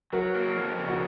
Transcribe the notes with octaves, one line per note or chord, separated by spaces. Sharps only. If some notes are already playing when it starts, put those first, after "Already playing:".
F#3 F#4 A#4
A#3
F2
C#3
F#4